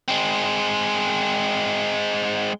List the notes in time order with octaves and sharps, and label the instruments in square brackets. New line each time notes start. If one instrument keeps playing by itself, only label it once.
[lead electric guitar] G#3 C4